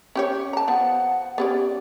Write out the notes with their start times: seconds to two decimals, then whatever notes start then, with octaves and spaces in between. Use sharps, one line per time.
0.15 C#4 G4 C#5
0.53 A5 A#5
0.68 F3 B3 F#5
1.38 B3 C#4 G4 D5